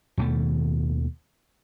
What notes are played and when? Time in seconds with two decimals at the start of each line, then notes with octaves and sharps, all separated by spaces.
0.18 D#2 B2 D#3 A3